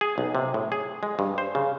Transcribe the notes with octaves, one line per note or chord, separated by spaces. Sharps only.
G#4
B1
C3
A2
G#4
G#3
G2
C5
C#3